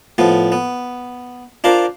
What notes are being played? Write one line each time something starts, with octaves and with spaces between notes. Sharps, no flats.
A2 F3 B3
B3
D4 F4 A#4 C5